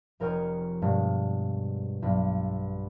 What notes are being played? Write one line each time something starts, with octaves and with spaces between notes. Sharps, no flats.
F1 A#4 C#5 G5 D#6 F6
G2 B2 G#3
B1 G2